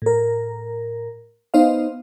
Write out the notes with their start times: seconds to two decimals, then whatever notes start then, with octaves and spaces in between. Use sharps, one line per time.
0.02 A2 A#4
1.54 B3 D#4 C5 D#5 F5